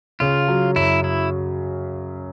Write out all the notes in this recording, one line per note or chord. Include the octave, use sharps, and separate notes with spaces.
C#3 F4
F#3
F#2 E4
E4